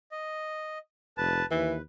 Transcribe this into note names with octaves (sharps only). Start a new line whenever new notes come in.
D#5
F1 B4 A5
D#2 E3 B4